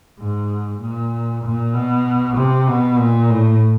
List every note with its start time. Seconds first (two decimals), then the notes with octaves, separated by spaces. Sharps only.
0.19 G#2
0.81 A#2
1.44 A#2
1.74 B2
2.37 C3
2.68 B2
2.99 A#2
3.30 A2